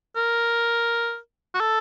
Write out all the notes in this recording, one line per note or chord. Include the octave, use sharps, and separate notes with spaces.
A#4
F#4
A4